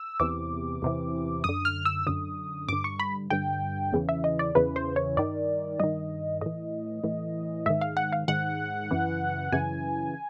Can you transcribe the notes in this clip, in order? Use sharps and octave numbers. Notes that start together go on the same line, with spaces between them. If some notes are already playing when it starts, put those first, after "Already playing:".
Already playing: E6
E2 C3 E3 D6
E2 C3 E3
F#2 D3 D#6
F6
E6
F#2 D3 D#6
G2 D3 D6
C#6
B5
G2 D3 G5
E2 C#3 E3
E5
D#5
D5
E2 C#3 E3 B4
C5
C#5
G2 D#3 D5
G2 D#3 D#5
A2 E3 D#5
A2 E3
G#2 D#3 E5
F5
F#5
F5
G#2 D#3 F#5
F#2 C#3 E3
F#2 C#3 E3 G#5